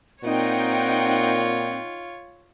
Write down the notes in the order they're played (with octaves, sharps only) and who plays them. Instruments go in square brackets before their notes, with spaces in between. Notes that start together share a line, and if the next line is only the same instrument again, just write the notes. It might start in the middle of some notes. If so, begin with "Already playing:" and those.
[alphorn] A#2 [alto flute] C4 [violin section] D#4 F#5 G5 [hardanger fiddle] F4 C#5